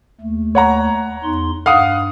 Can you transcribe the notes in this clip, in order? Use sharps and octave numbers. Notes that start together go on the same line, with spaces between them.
D#2 A3
C#5 F#5 A#5
E2 D#4 C6
G2 F5 F#5 D#6